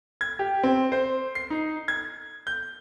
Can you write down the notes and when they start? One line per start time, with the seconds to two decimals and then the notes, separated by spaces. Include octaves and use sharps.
0.21 G#6
0.39 G4
0.63 C4
0.92 C5
1.35 C7
1.50 D#4
1.88 G#6
2.47 G6